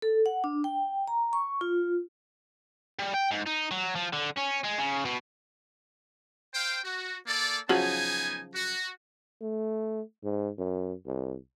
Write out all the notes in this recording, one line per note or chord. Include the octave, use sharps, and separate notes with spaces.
A4
F#5
D4
G5
A#5
C#6
F4
G3
G5
G#2
D#4
F#3
F3
D3
C#4
G#3
C#3
B2
C5 F5 G5
F#4
A#3 A4 D5
C#3 F3 F#3 B3 D#4 G#5
F#4
A3
G#2
F#2
C2